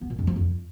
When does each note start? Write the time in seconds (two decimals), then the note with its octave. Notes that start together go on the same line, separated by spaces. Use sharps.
0.01 B3
0.10 A#2
0.19 F2
0.27 F3
0.36 F2